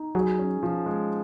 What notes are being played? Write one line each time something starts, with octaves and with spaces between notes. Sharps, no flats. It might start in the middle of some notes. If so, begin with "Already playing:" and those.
Already playing: D#4
F#3 G#4
C#4
F3
G#3